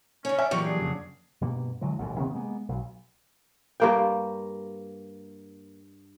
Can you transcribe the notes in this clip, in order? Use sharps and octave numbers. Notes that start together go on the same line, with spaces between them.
C#3 C#4 C#5
D5 E5 G#5
C#2 A#2 E3 F#3 G4 C#6
D4 G#4
F2 C#3
G2 B2 A#3
D3 E3 F#3 G#3
A1 D#2 G#2 B2
C3 D#3 B3 C4
G#3 A#3 B3
B1
G2 A#3 G5